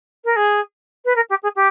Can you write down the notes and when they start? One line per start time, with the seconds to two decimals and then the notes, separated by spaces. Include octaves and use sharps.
0.24 A#4
0.36 G#4
1.05 B4
1.15 A#4
1.29 G4
1.43 G#4
1.55 G4